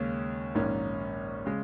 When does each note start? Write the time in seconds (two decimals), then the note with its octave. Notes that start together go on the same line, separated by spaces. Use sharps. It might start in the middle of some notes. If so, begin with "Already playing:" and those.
Already playing: D#2 C#3 G#3 C#4
0.55 A#1 G#2 D#3 A#3 C#4
1.46 C#3 G#3